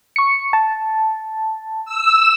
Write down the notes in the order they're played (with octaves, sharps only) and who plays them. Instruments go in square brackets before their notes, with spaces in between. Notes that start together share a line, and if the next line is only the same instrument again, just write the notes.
[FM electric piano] C#6 C#7
A5
[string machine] E6